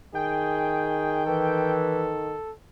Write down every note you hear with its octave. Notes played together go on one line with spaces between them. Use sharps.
D#3 G#4 G5
E3 A4